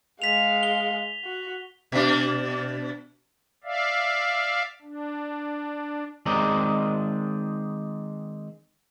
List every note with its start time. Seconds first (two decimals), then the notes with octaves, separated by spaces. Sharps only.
0.22 G#3 F5 B6 F7
0.63 G7
1.24 F#4
1.92 B2 D4
3.64 D5 E5 F5
4.82 D4
6.26 D#3 G#3 C4 D5 D#5 A#5